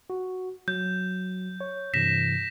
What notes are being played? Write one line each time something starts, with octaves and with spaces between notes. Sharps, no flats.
F#4
F#3 G6
C#5
G2 C3 E3 A#6 B6 E7